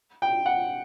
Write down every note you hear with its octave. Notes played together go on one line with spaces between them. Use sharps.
G5
F#5